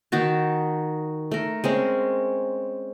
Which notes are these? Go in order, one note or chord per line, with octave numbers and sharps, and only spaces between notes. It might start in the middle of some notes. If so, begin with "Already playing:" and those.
D#3 D#4 F#4 A5
A3 A#4
G#3 C4 C#4